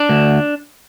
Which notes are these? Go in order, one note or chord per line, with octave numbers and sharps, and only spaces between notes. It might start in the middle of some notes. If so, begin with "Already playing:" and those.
Already playing: D4
D2